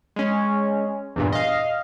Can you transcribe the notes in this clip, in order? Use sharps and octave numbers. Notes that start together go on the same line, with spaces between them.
G#3 C#4
E2 G2 A#2
D#5 F5